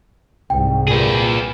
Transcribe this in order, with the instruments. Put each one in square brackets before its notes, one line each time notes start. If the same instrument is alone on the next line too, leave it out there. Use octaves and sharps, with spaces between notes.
[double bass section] C2 G#2 [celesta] G5
[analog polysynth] A#2 [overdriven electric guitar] G#4 B4